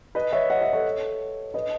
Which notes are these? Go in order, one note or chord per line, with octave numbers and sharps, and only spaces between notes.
B4 D#5
C#5 E5
D#5 F#5
C#5 E5
A4 C#5
B4 D#5